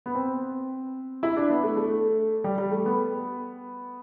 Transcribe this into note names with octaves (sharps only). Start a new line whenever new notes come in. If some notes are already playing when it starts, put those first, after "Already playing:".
B3
C4
E4
D4
B3
A3
A3
G3
G3
A3
B3